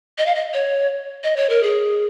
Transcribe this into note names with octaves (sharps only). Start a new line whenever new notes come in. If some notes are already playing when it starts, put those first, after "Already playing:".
D#5
F5
D#5
C#5
D#5
C#5
A#4
G#4